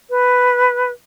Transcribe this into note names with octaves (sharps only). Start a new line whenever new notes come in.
B4